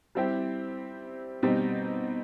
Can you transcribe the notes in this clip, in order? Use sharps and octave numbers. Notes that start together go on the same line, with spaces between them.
G3 C4 E4 G4
B2 G3 C4 D#4